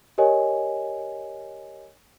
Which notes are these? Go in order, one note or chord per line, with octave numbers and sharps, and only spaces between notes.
G4 A#4 C#5 D#5 G#5